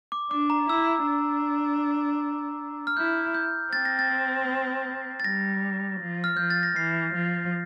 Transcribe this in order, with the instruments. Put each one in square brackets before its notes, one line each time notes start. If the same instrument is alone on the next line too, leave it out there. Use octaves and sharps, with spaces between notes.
[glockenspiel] D6
[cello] D4 [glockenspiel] D6
[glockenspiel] A#5
[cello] E4 [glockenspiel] E6
[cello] D4
[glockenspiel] F6
[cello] E4 [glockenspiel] G6
[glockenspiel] G6
[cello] C4 [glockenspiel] A6
[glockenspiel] A#6
A6
A6
[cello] G3 [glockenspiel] A#6
[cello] F3
[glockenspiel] F6
[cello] F3 [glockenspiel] G6
[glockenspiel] A6
A#6
[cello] E3 [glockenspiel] C7
[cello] F3